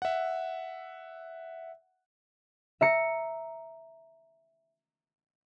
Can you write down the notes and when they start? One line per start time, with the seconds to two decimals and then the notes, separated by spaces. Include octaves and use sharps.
0.02 E5 F#5
2.81 E5 A#5 C#7